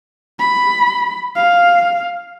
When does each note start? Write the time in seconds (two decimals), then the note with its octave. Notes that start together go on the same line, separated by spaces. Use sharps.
0.40 B5
1.36 F5